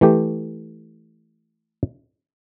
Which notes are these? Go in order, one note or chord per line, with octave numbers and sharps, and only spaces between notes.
E3 A3 G4